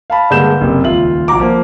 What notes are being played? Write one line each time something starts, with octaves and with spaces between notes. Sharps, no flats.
F5 A5 B5
G2 D3 G#3 A#3 G6 E7
F#1 C3
D#1 C#2 F4 E5 F#7
A#1 F4 F#4 A#5 D6
F3 A#3